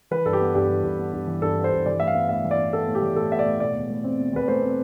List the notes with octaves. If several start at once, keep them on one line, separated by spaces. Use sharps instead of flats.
E3 B4
G2 A4
G4
B3
G2 G4
E3
G2
B3
G2
E3
G2 A4
B3
C5
G2
E3 D5
A2 E5
F5
B3
A2 E5
E3
D5
A2
B3 A4
A2
G4
E3
A2 A4
B3 E5
D5
A2
B2 D5
E2
A3
C4
B2
E2 B4
A3 C5
C4